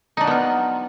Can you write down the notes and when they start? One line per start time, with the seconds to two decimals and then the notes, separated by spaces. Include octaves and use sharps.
0.17 D#4
0.21 D4
0.24 F#3
0.27 B3
0.31 F4